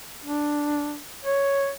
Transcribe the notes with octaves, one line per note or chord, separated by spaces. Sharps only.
D4
C#5